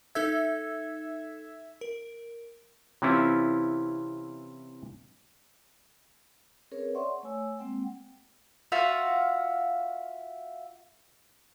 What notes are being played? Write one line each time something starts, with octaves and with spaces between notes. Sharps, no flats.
D#4 A4 E5 G#6
A#4
C3 E3 C4 C#4 E4 F4
C4 C#4 G#4 A#4 B4 C#5
C#5 D5 E5 F#5 C6 C#6
A3 C#5 G#5 E6
G#3 A#3 C4 F#5 G5
F4 F#4 E5 F5